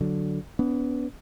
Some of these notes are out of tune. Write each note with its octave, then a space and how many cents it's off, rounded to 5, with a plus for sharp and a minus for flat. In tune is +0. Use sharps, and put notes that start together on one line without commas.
D3 +0 F#3 +0
B3 +0 D4 -45